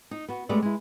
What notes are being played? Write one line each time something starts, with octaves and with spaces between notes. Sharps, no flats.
D#4
B3 F#4
G#3 A3 B3 C#4 G4 D5
G#3 E4